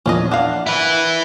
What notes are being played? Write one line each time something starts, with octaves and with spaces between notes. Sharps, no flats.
E2 A#2 F3 C#4 D4 D#5
D4 A#4 F5 F#5
E4 B4